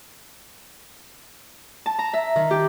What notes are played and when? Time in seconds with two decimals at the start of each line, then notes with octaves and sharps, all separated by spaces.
1.86 A5
1.99 A#5
2.13 E5
2.36 D#3
2.51 G4